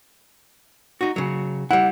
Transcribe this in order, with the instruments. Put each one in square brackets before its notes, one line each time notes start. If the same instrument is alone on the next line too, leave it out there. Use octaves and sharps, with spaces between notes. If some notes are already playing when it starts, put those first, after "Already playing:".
[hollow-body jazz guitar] D#4 F#4
C#3 F#3
[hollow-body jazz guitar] G3 E4 [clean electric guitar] F#5